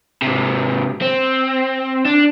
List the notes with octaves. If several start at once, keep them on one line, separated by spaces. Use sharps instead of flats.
G#2 C3
C4
D4